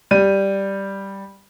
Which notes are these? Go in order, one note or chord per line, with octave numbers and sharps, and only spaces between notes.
G3 D#7